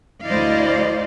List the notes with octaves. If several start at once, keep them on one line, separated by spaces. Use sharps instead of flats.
D2 E4 C5 D5 D#5 F5